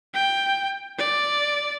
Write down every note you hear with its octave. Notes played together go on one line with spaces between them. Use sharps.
G5
D5